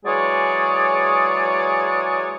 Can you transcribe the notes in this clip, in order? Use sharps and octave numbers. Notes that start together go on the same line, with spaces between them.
E3 F#3 G#3 G#4 C#5 D5